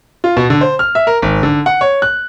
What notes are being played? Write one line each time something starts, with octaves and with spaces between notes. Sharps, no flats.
F4
B2
D3
C5
F6
E5
A#4
G#1
D3
F#5
C#5
F#6